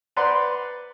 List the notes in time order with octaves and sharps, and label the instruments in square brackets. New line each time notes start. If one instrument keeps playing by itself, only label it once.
[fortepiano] B4 C5 D5 F#5 A#5 C6